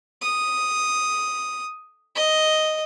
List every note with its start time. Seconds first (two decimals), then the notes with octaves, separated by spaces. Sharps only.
0.22 D#6
2.15 D#5